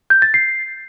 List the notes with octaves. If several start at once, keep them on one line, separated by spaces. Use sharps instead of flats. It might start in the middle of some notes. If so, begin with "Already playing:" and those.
G6
A6
C7